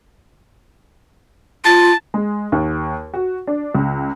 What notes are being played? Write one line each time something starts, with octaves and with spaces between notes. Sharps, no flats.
F4 A5
G#3
D#2
F#4
D4
C#2